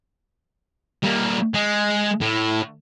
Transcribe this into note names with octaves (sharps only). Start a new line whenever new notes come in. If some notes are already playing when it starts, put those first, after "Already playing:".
G3 A#3
G#3
A2